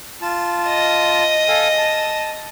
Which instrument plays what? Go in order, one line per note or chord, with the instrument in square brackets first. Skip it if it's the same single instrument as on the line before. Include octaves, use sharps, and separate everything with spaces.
[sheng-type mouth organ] F4 A5
[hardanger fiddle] D#5
[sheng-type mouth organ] A4 F5 G#5
A5